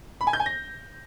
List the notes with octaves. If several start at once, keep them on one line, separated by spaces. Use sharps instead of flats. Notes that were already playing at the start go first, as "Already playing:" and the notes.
B5
G#5
G6
G#5
A#6